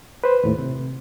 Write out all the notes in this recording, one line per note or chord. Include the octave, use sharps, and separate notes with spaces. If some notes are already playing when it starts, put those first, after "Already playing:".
B4 C5
D#2 A2
C3